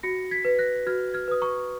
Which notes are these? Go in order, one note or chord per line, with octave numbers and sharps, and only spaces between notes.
F#4 A#6 C#7
G#6 B6
B4
F#6 A#6
F#4 F6 G#6
F6 G#6
B4 D#6
A#5 C#6